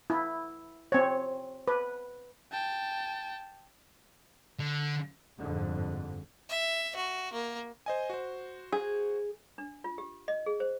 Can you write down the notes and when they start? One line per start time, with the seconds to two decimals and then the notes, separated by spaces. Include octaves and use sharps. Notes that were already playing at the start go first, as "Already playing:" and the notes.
0.10 E4
0.92 C4 C#5
1.68 B4
2.52 G5 A5
4.59 D3
5.40 G1 F2 G#2 D3
6.49 E5
6.95 F#4
7.33 A#3
7.86 C5 D#5 G#5
8.10 F#4 C5
8.72 G#4
9.58 D4
9.84 F4
9.98 G4
10.28 D#5
10.46 G#4
10.60 C5